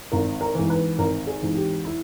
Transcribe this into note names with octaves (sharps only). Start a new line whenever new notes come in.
G#1 A#4
A#4
G#2 E3
B4
G#1 A#4
G#4
G#2 E3
G4
E4